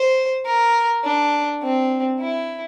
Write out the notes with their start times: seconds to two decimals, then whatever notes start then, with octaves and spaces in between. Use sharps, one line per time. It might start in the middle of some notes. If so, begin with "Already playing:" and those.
Already playing: C5
0.46 A#4
1.04 D4
1.62 C4
2.20 E4